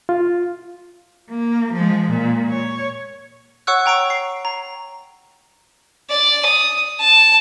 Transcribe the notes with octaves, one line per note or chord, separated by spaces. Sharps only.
F4
A#3
F3 G#3
A#2
C#5
C#5 F#5 C#6 E6 F#6
G5 A#5 C#6 D7
C7
A#5
D5
D#6
A5